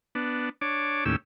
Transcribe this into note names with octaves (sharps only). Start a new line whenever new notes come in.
B3 D4
D4 C#5 D6
D#2 A2 C#4 G4 E6